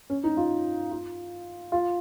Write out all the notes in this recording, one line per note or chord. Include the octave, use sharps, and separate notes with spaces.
C#4
D#4
F4
F4
F4